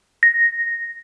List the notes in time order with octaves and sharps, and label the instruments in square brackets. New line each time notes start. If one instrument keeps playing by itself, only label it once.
[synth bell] A#6